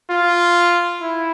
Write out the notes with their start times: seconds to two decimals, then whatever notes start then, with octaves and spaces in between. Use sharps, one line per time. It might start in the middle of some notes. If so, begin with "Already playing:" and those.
0.10 F4
1.02 E4